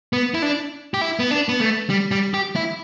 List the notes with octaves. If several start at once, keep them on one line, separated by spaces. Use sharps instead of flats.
B3
E4
D4
G4
E4
B3
D4
B3
A3
G3
G3
G4
E4